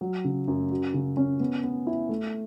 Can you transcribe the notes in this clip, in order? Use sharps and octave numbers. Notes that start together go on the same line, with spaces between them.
F#3
C#3
F#2
F#4
C#3
C#4
B3
B3
E4
A3